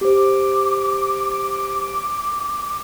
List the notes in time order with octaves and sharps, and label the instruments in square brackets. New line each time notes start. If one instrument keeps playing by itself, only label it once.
[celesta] G4 C5 [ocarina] D6